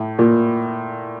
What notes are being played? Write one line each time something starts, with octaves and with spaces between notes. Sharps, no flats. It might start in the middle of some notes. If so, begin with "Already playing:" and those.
Already playing: A2
A#2